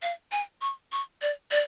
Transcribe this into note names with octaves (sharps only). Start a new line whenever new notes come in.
F5
G#5
C#6
C#6
D5
D5